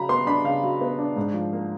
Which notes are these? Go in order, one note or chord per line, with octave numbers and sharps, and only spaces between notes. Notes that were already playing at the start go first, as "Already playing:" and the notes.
Already playing: C#3 F#3 A#5 B5
B3 C6
D4 B5
C#3 F5
F#3
B3
D4
G#2
F3
A#3